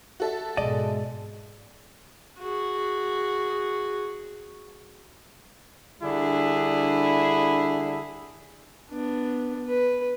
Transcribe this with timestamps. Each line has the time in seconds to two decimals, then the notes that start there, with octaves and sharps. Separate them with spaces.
0.20 F#4 A4 E5
0.57 G#2 B2 G#3 D5 D#5
2.39 F#4 G#4
6.02 D3 G3 D4 E4 G#4
8.91 B3 D4
9.68 B4